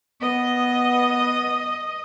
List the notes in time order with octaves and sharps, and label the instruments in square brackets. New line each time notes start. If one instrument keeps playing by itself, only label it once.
[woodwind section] B3 [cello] D#5